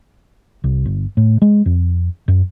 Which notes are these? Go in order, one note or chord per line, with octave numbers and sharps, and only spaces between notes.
C2
G1
A2
G#3
F2
F#2